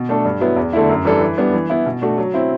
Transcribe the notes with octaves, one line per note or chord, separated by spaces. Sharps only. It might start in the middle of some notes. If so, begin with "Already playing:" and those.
Already playing: B2
A3 D4 A4
G2
F#3 B3 E4 B4
E2
D3 A3 E4
F#2
E3 G3 D4 A4
E3
G3 B3 D4
E3
B3 E4
B2
A3 D4 F#4
F#3
C4 E4